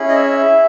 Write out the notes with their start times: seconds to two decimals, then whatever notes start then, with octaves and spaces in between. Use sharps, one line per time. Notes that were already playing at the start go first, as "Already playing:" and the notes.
Already playing: C#4 E4 G#4
0.08 D#5
0.14 E5